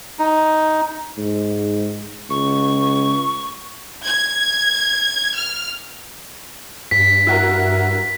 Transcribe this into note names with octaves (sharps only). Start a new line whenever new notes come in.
D#4
G#2
C#2 C#6
G#6
F6
G2 B6
E4 F#4 A#4